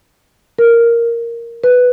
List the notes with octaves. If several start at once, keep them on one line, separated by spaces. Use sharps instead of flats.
A#4
B4